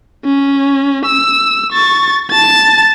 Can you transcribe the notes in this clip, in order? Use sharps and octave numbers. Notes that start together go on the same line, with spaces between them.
C#4
E6
C#6 A6
A5 A6